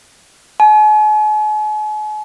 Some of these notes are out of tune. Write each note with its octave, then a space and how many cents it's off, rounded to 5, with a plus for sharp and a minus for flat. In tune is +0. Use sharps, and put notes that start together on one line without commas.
G#5 +45